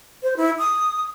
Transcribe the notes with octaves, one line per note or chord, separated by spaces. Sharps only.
C5
E4
D#6